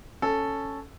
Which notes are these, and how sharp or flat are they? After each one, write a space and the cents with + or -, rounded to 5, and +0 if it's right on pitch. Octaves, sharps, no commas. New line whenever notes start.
C#4 +0 A4 +0